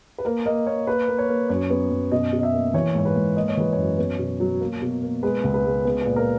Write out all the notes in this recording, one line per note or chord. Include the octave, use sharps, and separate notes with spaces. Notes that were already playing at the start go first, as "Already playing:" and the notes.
B4
A#3 A#4
A#3 D#5
A#3 C#5
A#3 B4
A#3
C#5
A#3
F#2 C#5
B3
F#2
B2 D#5
B2
D#5
E5
A#3
E3 C#5
G#2 C#5
B4
G#2
A#3 D#5
C#5
E3 B4
F#2 C#5
B3
B2
F#3
A#3
B2
A#3
G#3 B4
C#2
B4
G#3
B3
B4
A#2
A#4